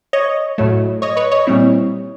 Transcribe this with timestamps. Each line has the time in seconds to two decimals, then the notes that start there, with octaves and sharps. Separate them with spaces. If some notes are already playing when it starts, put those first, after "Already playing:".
0.13 C#5 D#5
0.58 A2 F#3 A3
1.02 C#5 D#5
1.17 B4 C#5
1.31 C#5 D#5
1.47 A#2 G3 C4 E4